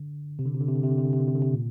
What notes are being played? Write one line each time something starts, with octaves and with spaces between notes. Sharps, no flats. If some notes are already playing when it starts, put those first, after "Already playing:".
Already playing: D3
C3
D3
C3
D3
C3
D3
C3
D3
C3
D3
C3
D3
C3
D3
C3
A#2